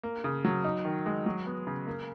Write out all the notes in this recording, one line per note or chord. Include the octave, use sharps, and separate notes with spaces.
A#3
C#3
F#3
D#4
D#3
G#3
F#3
B3
C#3
A#3